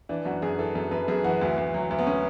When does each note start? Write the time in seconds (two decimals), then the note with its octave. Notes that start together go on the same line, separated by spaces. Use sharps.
0.09 E3 D4
0.26 F#2 F#4
0.42 F#2 G#4
0.58 E3 A4
0.75 F#2 A4
0.91 F#2 B4
1.08 F#2 G#4
1.24 E3 F#4
1.41 D2
1.58 D2
1.74 F#3
1.91 D2
1.99 B3
2.07 C#4